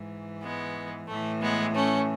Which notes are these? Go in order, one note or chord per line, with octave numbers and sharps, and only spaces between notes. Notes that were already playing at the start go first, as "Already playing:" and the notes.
Already playing: G#2 E3
G#3 B3
A2 E3 A3
G#3 B3
A3 C#4